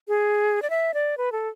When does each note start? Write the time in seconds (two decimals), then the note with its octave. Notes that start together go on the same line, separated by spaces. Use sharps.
0.08 G#4
0.62 D5
0.70 E5
0.94 D5
1.18 B4
1.32 A4